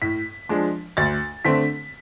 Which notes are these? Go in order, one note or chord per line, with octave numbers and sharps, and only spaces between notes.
A2 B6
F3 G#3 D4
D2 A6
D3 A3 C4 B6